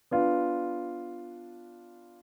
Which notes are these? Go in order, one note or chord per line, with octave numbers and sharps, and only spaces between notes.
B3 D4 F4